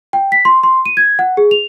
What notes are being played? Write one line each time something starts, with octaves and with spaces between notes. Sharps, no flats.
G5
B6
C6
C6
D#7
G#6
F#5
G#4
F7